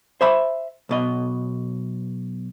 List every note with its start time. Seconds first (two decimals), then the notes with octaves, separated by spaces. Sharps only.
0.21 C5 E5 B5
0.89 B1 B2 D#5